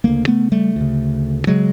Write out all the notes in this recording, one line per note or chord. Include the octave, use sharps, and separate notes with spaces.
D2 C#3 G#3 A#3
A3 B3
G3 A3
D2 C#3
C#3 F#3 G#3